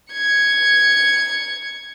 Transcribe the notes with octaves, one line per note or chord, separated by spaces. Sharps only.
G#6 C#7